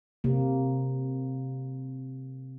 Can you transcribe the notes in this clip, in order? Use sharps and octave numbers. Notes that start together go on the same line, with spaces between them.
C3 A#3